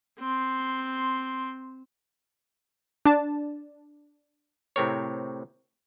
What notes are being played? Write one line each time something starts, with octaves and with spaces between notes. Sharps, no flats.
C4 C6
D4 A5
A2 C3 C4 A#4 C#5